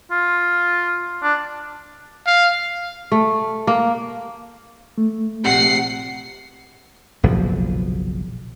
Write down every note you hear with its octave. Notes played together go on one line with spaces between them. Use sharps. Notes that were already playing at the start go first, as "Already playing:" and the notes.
F4
D4
F5
A3
A#3
A3
A#1 C3 F#5 C7
F#1 B1 A#2 F3